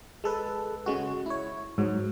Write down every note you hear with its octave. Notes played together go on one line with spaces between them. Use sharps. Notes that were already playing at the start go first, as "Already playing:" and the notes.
G#3 A4 B4
C#3 G#3 F#4
E4 C#5
G#2 F#3